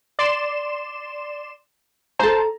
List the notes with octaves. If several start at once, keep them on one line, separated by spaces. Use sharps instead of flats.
D5 C6 E7
A4 C5 A5 A#5